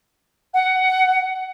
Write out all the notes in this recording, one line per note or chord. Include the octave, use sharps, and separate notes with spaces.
F#5